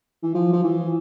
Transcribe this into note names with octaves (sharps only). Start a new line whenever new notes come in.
E3
F3
F3
E3